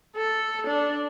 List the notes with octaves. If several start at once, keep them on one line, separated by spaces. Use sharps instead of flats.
A4
D4